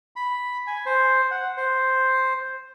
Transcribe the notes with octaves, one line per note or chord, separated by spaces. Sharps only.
B5
G#5
C5
F#5
C5